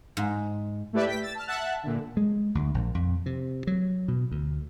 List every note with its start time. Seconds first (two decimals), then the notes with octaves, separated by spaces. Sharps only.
0.17 G#2
0.93 A3 E4 G4 B4 D5 E5
1.05 G5 B6
1.22 E6 A6
1.35 A5 F6
1.47 E5 F#5 A5 F#6
1.83 A#2 D3
2.17 G#3
2.55 D2
2.74 A#1
2.95 F2
3.26 C3
3.67 F#3
4.08 B2
4.31 D2